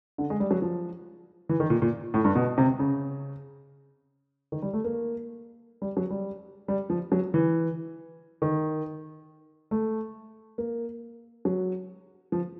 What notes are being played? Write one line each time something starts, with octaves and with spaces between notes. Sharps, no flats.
D3
G#3
G3
F#3
F3
E3
D#3
A#2
A#2
A2
G2
B2
C3
C#3
D#3
G3
A3
A#3
G3
F#3
G3
G3
F3
F#3
E3
D#3
A3
A#3
F#3
F3